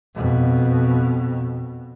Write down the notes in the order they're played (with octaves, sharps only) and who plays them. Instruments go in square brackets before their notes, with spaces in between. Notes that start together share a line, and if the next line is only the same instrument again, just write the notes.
[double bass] F2 B2